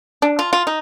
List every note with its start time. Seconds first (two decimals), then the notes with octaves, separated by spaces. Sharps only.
0.22 D4
0.39 F4
0.53 F4
0.67 D#4